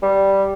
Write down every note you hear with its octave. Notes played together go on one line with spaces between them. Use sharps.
G3